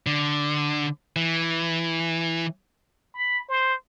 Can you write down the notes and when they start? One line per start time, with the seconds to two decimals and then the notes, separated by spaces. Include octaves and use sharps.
0.06 D3
1.16 E3
3.15 B5
3.48 C5